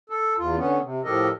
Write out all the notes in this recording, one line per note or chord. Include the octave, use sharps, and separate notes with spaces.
A4
E2 F4
D3 B3 C#4
C3
A2 F3 G4 A4 A#4 D#5